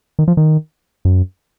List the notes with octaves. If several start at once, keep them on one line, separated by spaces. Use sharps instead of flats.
D#3
F3
D#3
F#2